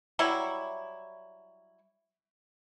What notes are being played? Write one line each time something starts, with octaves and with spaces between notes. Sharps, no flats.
F#3 G3 E4